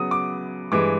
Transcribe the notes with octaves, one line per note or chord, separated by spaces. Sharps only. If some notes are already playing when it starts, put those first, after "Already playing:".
Already playing: C#3 F#3 B3 D#6
D6
G2 E3 G#3 D6